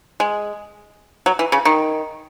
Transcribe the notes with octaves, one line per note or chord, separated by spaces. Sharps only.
G#3
F#3
E3
C#3
D#3